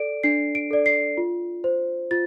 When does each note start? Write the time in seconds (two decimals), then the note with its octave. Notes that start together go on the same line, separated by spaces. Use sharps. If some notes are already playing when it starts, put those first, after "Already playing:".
Already playing: A4 D5 D7
0.23 D4 C7
0.55 D7
0.70 A4 D5
0.86 C7
1.17 F4
1.64 C5
2.11 F4 A6